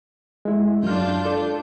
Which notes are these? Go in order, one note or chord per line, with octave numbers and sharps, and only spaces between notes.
G#3 E4
F#2 D4 F4 F6 G6
A4 D5